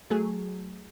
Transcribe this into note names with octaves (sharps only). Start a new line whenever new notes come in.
F#3 A3 G#4